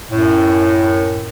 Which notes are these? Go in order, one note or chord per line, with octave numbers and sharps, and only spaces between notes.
F#2 A2